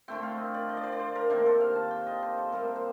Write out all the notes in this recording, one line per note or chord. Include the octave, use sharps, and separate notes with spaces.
D3 A3 C4 G5
F5
D#5
D5
D#5
D5
C5
D5
C5
A#4
C3 D#3 A#3 D4 C5
A4
F5
A5
G5
D#5
C5
A4
C3 G3 A#3 A#4
C5